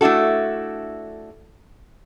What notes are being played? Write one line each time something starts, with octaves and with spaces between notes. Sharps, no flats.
A3 D4 E4 F#4 A4